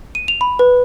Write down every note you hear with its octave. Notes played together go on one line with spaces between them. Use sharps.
D#7
F7
B5
B4